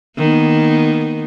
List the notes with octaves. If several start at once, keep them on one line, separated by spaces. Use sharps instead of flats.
D#3 A#3 B3